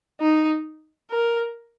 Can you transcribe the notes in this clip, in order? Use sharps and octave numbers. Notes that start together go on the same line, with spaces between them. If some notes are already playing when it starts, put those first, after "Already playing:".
D#4
A#4